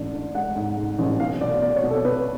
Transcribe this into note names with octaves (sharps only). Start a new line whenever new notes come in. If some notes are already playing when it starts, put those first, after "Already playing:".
Already playing: A1 G#2 D4
D4
G#3 F#5
G#2
G#2
A1
B1 F5
B2 D5
B1 D5
C#5
B2
A4
B2 B4